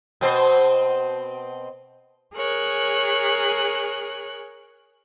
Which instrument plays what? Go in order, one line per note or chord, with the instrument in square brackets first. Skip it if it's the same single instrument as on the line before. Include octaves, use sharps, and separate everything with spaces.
[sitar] B2 C4 C5
[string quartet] G#4 A#4 C#5 F#6